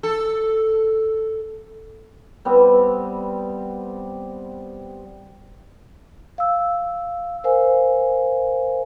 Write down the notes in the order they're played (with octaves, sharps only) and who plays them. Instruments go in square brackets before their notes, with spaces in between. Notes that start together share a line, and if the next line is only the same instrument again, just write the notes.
[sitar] A4
[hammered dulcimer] G3 B3 C4
[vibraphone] F5 E6
A#4 C5 F5 G#5